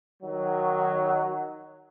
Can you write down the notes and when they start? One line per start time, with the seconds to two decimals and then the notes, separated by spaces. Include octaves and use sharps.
0.22 D#3 F#3